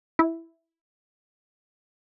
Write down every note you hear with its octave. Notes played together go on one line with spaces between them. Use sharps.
E4